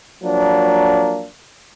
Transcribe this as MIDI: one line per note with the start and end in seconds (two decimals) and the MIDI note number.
0.23 1.26 53
0.23 1.26 54
0.23 1.26 58
0.23 1.26 62